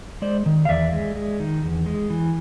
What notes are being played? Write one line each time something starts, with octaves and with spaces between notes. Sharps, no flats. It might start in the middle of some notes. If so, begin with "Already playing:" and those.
G#3 C5 D5
D#3
F5
E2 D5 E5
G#3
G#3
D#3
E2
G#3
E3